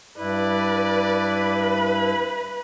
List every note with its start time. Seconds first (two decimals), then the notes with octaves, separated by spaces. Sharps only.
0.18 G2 E4 B4 D5
1.19 B4 B5